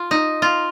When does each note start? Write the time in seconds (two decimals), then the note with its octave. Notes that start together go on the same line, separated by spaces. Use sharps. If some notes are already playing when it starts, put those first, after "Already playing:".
Already playing: F4
0.11 D#4
0.42 F4